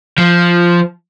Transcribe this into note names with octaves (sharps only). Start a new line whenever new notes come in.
F3